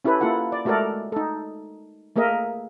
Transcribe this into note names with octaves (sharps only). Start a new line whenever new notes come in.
C#4 E4 G4 A4 B4
A#3 E4 F4 A4 F#5
D5
G#3 A3 F#4 A4 A#4 D5
D#4 A4
A3 A#3 G#4 A#4 D#5 E5